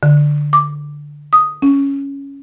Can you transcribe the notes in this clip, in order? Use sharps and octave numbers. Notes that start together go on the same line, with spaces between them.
D3
D6
D#6
C#4